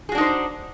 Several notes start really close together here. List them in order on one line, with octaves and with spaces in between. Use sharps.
G#4 F#4 D4 D#4 C5